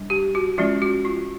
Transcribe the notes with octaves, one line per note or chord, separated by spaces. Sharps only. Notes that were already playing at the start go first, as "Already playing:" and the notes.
Already playing: G3 D4
G4
F#4
F3 G#3 C#4 F4
F#4
F4